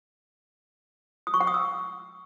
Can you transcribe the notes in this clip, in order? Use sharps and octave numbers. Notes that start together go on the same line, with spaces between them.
D#6
C#6
F#5
D#6
E6